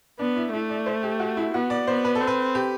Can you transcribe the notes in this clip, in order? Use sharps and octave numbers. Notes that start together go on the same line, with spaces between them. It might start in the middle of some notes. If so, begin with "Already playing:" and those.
B3 D4
E4
A3 E4
D5
C5
G4
F#4
E4
B3 F#4
D5
B3 C5
B4
A4
C4
B4
G4